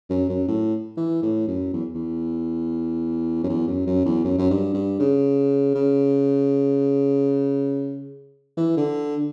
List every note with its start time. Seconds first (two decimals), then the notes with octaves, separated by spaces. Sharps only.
0.10 F#2
0.29 F#2
0.48 A2
0.97 E3
1.23 A2
1.48 F#2
1.73 E2
1.95 E2
3.43 F#2
3.49 E2
3.67 F#2
3.87 F#2
4.06 E2
4.24 F#2
4.38 F#2
4.50 G2
4.74 G2
5.00 C#3
5.75 C#3
8.57 E3
8.77 D3